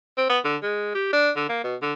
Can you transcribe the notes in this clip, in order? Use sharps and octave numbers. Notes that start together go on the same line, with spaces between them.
C4
B3
D3
G#3
G4
D4
D3
A#3
B2
D3